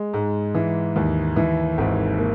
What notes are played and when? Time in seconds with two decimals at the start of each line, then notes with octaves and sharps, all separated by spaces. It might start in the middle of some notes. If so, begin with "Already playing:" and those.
Already playing: G#3
0.13 G#2
0.55 E3
0.96 D#2
1.36 E3
1.78 G#1
2.19 A#3